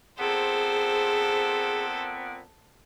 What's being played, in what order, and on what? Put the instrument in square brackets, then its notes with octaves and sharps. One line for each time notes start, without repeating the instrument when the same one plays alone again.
[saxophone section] A#2 B3 C4 [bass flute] G#4 [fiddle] A4 C5